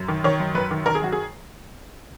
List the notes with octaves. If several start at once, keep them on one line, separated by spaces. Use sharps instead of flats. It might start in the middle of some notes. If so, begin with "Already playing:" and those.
Already playing: F#2
D#3
D#3 C#5
F#2
F#2 B4
D#3
D#3 A#4
G#4
F#2 F#4
G#4